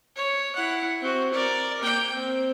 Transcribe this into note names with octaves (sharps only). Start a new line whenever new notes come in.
C#5
E4 F#5
C4 F#4
A#4 D5
A#3 G5
C4